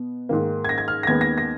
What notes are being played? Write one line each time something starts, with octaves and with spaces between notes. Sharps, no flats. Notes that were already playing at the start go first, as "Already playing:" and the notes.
Already playing: B2 B3
G#2 D#3 A#3
G#6
A#6
G#6
F6
A#6
D#2 D#3 G#3 B3 G#6
A#6
A#6